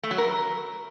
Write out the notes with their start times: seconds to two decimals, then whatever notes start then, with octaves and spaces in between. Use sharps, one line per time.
0.03 A3
0.11 F#3
0.18 A#4